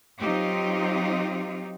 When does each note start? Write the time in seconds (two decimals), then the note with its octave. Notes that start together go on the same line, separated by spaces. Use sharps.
0.19 F#3 C4 D#4 F4 G4